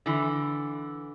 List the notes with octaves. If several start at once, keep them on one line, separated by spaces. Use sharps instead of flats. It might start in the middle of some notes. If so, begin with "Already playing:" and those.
D3 E3